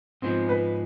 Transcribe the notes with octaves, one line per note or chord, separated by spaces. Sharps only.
G#2 F3 G#3 B3 C4
B4